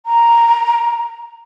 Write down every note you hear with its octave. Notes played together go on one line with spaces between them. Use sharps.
A#5